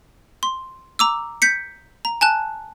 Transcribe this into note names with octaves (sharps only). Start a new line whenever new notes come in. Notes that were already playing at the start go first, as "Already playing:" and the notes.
C6
A#5 D6 E6
G6 B6 C#7
A#5
G#5 A5 F#6